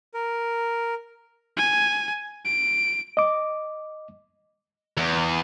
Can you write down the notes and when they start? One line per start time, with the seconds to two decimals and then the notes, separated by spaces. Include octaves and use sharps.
0.14 A#4
1.57 G#5
2.45 D7
3.17 D#5 D6
4.97 E2